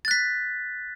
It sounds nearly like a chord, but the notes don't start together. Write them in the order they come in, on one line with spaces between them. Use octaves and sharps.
A6 F#6 B6